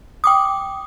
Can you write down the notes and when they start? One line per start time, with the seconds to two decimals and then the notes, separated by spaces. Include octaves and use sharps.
0.24 G5 D6 D#6